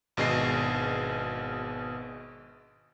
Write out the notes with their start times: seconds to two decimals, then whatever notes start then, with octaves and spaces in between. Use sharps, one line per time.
0.17 G#1 B2 D4 G#4 D#5 C7